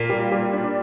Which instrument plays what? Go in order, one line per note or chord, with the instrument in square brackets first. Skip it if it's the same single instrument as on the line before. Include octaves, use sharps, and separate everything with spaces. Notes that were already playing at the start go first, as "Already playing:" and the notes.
Already playing: [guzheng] A#2 [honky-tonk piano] A#3
[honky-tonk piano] G3
G3
D4